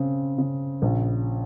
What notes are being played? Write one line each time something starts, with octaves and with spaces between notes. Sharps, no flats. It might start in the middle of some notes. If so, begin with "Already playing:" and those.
Already playing: C#3 C4
C#3
A#1